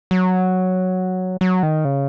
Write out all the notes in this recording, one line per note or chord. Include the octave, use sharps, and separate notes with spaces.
F#3
F#3
D#3
C#3